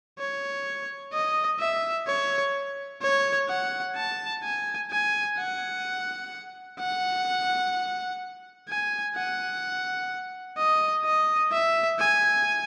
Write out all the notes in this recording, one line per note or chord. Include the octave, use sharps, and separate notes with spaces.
C#5
D#5
E5
C#5
C#5
F#5
A5
G#5
G#5
F#5
F#5
G#5
F#5
D#5
D#5
E5
G#5